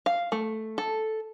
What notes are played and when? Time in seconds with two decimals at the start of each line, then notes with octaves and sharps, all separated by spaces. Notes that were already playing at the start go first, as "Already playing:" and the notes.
0.06 F5
0.32 A3
0.78 A4